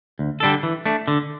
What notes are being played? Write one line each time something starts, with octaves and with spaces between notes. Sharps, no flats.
D2
D3 G3 D4 A4
E3
A3 D4
D3